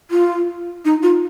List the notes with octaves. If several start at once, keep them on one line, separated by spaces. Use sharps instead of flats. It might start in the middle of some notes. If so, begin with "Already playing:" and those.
F4
D#4
F4